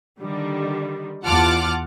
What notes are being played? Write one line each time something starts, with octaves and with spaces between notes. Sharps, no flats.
D3 D#3 G3
E2 F4 F#5 A5 D6 F6